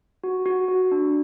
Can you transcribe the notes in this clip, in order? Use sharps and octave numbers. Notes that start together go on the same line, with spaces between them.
F#4
F#4
F#4
D4